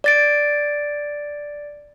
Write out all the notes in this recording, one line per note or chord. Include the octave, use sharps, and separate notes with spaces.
D5 A6 D7